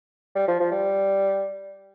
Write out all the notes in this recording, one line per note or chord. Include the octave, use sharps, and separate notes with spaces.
G3
F3
F3
G3